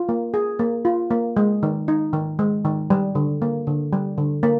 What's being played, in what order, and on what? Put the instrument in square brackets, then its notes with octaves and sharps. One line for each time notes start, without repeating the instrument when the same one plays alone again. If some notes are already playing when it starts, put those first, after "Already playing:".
Already playing: [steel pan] F4
A#3
G#4
A#3
F4
A#3
G#3
D#3
D#4
D#3
G#3
D#3
G3
D3
A#3
D3
G3
D3
A#3